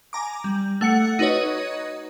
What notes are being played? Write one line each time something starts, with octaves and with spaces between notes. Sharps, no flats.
G#5 A#5 D6
G3
A3 F#5 C#7
D#4 F#4 B4 C#5 D#5